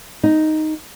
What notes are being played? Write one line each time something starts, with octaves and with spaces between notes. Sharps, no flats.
D#4